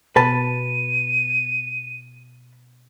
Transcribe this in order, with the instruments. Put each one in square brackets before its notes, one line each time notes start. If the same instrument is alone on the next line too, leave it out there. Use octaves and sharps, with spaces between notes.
[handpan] B2 [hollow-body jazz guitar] B4 A5 [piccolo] D#7